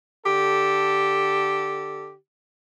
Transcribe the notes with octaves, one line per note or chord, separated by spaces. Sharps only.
D3 G4 A4